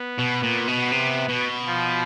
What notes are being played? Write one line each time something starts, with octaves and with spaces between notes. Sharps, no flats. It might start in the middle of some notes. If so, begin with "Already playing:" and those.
Already playing: B3
B2
A#2
B2
C3
B2
F3